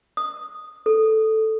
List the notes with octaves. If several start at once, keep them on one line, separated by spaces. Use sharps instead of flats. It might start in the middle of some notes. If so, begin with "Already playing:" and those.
D#6
A4